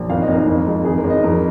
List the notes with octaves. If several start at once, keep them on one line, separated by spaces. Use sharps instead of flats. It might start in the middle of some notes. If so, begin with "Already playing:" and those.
Already playing: A#1
G#1 F5
D#5
G#1
A#4
F2
G#3
G#1 G#4
A#4
G#1
D#5
F2 A#4